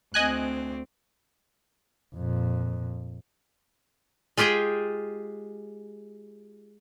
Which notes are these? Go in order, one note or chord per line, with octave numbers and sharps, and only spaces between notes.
D2 C4 D#5 G#5 F#6
F2 A#2
G#3 F4 G4 G#4 G5